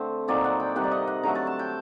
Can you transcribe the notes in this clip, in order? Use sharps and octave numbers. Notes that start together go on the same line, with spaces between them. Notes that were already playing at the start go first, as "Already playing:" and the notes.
Already playing: D3 A3 C4
A#2 F#3 C4 D#4 D5
F#5
G5
C3 D#3 G3 F#5
D5
D#5
F#5
D3 F#3 A3 A#5
A5
A5
G5